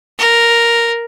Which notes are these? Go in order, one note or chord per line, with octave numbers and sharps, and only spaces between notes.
A#4